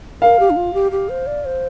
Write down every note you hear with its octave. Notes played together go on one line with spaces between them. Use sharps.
A#4 F5
G4
D4
F4
G4
G4
C5
D5
C5